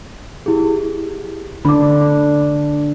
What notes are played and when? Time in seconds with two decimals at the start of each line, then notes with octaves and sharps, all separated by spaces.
0.46 E4 G4 G#4
1.65 D3 D4 B5 D6